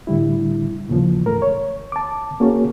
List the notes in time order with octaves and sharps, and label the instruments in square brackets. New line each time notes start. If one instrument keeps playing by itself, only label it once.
[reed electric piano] A2 D3 G3 E4
D#2 A#2 C#3 E3 F3
G#2 A3 A#4
C#5
A5 D6
A#3 C#4 F#4 G#4 C#5